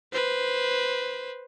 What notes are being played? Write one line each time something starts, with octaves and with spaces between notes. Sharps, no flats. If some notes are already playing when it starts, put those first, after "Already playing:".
B4 C5